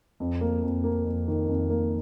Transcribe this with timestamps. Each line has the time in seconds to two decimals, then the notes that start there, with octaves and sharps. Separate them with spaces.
0.20 F2
0.41 A#3
0.63 F2
0.84 A#3
1.05 F2
1.28 D#3
1.49 F2
1.70 A#3